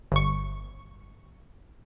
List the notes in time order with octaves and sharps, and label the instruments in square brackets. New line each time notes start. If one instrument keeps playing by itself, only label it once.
[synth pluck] G1 C#6